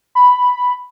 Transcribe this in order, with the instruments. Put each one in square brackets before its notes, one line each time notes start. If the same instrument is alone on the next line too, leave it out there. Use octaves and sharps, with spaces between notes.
[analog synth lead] B5